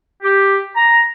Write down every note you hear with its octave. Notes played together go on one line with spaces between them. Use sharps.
G4
A#5